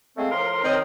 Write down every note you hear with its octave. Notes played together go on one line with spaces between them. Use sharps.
G#3 A3 C4 F5
A2 F3 A#4 C6
D#3 C4 C#5 D#5